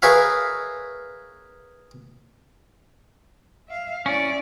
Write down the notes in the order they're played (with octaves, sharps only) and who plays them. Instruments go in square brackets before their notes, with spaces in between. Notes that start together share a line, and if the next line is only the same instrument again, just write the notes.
[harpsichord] G#4 A#4 B4 C#5 E5 F5
[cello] E5 F5
[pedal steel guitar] C#4 [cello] E4 D5